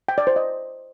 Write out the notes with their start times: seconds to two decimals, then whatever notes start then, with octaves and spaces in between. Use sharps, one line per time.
0.09 G5
0.18 D5
0.27 C5
0.36 D#5